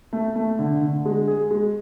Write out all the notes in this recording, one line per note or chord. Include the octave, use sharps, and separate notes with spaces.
A3
A3
D3
D3
G#3
G#4
G#3